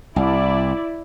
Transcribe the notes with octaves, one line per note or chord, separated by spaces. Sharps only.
C2 E4 D5